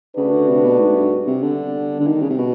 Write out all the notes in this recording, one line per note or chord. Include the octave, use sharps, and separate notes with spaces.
C#3 A3 D4 F#4 B4
D3
C3
B2
G#2
G2
C3
D3 G3 B3 D4
D3
D#3
C#3
C3
B2